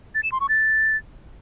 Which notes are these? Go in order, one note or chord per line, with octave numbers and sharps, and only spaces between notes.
A6
E7
C6
C#6
A6